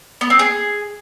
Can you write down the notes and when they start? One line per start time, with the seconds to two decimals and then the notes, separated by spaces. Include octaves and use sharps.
0.21 B3
0.30 C4
0.39 G#4